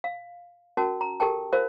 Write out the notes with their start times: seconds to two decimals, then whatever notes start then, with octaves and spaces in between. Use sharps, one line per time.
0.04 F5
0.77 C#4 F#4 A#4 A5
1.01 A#5
1.20 G4 A4 A#4 G5 A5
1.52 F4 A#4 C5 F5